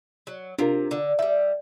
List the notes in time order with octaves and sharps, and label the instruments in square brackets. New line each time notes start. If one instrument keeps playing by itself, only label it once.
[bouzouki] F#3
[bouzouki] C3 [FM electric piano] D4 F4 A#4
[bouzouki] D3
[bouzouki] F3 G3 [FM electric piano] E5